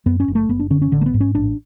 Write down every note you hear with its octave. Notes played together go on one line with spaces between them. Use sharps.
F#2 B3
C#4
F#1
A3
F#1 B3
D4
D3 C#4
C#4
A1 D3
A3
B3
G#2
C#4
A1 D4